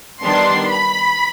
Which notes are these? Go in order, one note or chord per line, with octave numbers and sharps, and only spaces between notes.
D#3 G3 B3 D4 C6
B5